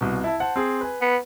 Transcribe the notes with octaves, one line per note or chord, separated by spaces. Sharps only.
C2 B2
E4 E5 A5
C5 F#5 A5
C4 G#4
B4 G#5
B3